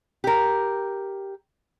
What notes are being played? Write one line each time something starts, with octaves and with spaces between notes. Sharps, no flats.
G4 A#4